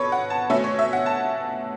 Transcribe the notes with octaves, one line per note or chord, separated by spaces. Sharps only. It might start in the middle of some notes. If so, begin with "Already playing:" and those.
Already playing: B2 A4 B4 C#5
F#5
A5
B2 A3 C#4 E5
C#5
E5
F#5
A5